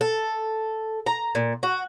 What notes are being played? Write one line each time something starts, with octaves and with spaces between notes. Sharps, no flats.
A4
A#5
A#2
F#4